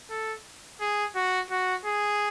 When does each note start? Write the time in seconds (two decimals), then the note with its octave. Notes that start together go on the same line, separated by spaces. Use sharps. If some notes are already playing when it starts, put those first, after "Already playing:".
0.10 A4
0.81 G#4
1.16 F#4
1.51 F#4
1.85 G#4